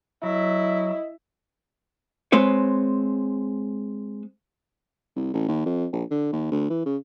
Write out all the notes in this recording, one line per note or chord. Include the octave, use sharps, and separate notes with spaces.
F#3 E4 D#5
G#3 C4 B4 C#5
C2
A1
D#2
F2
A#1
D3
D#2
D2
E3
C#3